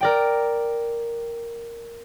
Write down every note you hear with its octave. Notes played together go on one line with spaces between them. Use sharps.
A#4 D5 G5